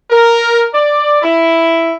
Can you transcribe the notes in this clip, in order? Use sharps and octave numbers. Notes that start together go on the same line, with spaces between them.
A#4
D5
E4